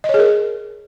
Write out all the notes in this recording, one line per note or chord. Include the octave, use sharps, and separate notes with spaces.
D#5
C#5
G#4
A#4